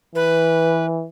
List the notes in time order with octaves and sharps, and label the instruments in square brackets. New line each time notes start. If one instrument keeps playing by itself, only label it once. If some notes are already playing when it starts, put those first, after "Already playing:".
[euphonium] E3 [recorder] B4